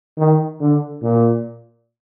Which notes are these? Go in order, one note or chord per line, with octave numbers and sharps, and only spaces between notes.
D#3
D3
A#2